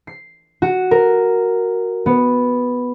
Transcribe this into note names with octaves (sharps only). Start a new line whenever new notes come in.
C7
F#4
A#4
B3